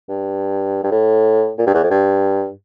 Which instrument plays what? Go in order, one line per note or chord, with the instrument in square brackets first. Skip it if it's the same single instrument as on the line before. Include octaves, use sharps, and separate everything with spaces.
[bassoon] G2
G2
A2
A#2
G2
E2
F2
G2